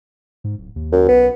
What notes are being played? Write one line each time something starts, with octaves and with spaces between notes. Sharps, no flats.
G#2
D1
D#2
F#2
B1 B3